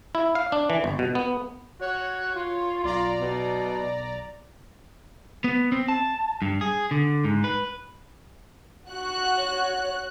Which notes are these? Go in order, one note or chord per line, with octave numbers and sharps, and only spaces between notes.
E4
F5
D4
E3
G1
B2
B3
F#4 C#5
F4
B1 F4 D5 A#5
B2
B3
C4
A5
G2
G#4
D3
G#2
B4
F#4 F#6
C#5